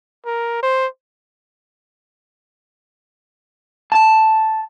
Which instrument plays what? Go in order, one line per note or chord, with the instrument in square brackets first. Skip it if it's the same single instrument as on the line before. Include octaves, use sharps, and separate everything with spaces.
[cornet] A#4
C5
[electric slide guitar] A5